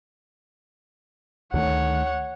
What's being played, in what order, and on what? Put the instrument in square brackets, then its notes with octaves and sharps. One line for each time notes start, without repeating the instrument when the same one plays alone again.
[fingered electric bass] D2 D#3 A3 [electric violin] C#5 F#5